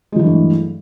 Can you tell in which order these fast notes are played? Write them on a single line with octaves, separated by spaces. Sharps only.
G#3 F#3 E3 G2 A3